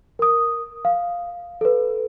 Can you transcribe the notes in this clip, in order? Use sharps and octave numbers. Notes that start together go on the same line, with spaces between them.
A#4 D#6
F5
A4 B4